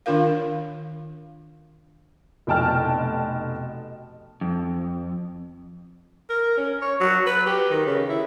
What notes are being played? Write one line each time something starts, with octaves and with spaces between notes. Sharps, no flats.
D#3 D4 F4 A#4 F5
F1 B2 G5 A5 F6
F2
A#4
C#4
C#5
F#3
B4
G4
D#3
C#3
E4